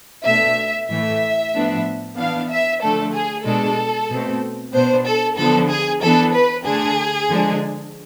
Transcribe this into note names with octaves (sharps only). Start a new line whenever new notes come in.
B2 A3 D4 E5
A2 E3 A3 E5
A2 F3 B3 D4
E3 B3 D4 F5
E5
D3 F3 A3 D4 A4
G#4
B2 G#3 D4 A4
B2 A3 C4
B2 B3 D4 C5
A4
D3 F3 B3 D4 A4
G#4
E3 B3 D4 A4
B4
D3 A3 D4 G#4
D3 F3 G#3 D4